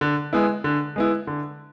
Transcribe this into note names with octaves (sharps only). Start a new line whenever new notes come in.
D3
G#3 B3 E4
D3
G#3 B3 E4
D3